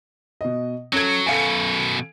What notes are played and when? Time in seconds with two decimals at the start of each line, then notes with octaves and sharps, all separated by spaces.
0.41 B2 D#5
0.93 F#3 C#4 A4 G#6
1.26 F#2 B2 A4 F5 G#5